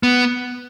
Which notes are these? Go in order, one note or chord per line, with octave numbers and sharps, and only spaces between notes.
B3